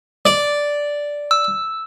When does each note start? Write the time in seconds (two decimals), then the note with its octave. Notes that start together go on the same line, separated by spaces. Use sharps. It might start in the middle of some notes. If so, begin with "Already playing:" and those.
0.25 D5
1.31 E6